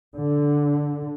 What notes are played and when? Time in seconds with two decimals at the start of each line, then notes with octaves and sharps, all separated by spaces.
0.17 D3